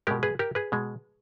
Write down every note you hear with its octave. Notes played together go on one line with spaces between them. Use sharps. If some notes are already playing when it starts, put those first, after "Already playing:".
B2 G#3 G4 A#4
G#4 B4
G4 A#4
G#4 B4
B2 G#3